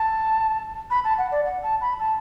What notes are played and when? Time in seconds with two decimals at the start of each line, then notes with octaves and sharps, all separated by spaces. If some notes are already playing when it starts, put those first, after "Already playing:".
Already playing: A5
0.91 B5
1.04 A5
1.18 F#5
1.32 D5
1.45 F#5
1.63 A5
1.81 B5
2.00 A5